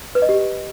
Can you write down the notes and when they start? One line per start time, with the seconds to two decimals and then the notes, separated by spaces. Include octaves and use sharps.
0.15 B4
0.22 D#5
0.29 G4